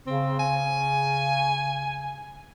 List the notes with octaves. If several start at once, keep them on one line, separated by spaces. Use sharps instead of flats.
C#3 C4
G#5